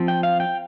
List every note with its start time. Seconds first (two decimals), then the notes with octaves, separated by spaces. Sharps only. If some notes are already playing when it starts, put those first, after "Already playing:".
Already playing: F3 C4
0.08 G5
0.23 F5
0.40 G5